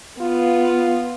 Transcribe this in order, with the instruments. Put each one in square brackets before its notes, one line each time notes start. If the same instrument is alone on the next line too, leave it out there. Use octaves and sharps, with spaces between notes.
[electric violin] B3 [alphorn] F4